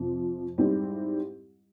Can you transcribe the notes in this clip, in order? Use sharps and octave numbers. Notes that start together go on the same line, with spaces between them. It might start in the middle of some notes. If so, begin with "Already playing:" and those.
Already playing: F2 C3 F3
G#2 G3 C4 E4 G4